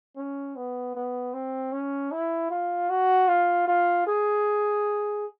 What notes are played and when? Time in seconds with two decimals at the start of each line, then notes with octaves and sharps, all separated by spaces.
0.16 C#4
0.56 B3
0.95 B3
1.34 C4
1.73 C#4
2.12 E4
2.51 F4
2.90 F#4
3.28 F4
3.68 F4
4.07 G#4